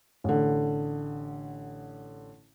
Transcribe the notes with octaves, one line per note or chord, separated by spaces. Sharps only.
A1 D3